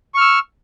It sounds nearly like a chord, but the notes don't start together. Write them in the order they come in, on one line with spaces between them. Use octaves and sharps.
C#6 F6 E6